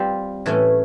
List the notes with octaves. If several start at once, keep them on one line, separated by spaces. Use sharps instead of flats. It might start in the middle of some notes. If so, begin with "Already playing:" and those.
Already playing: G3 C4 F4
A2 E3 A3 C#4